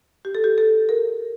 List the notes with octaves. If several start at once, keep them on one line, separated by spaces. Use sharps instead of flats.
G4
A4
G4
A4
A#4